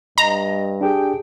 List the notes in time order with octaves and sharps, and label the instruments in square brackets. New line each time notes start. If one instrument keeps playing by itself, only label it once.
[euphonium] G2 [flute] D#5 [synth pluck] A#5
[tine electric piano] D4 G4 G#4 [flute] G5